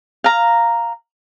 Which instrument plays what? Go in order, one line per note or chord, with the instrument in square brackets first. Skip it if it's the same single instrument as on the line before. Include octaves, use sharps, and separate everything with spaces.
[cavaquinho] F5 A#5